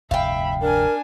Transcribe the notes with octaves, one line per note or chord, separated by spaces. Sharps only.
F1 D2 G2 E5 F5 G5 B5
D4 A#4 G#5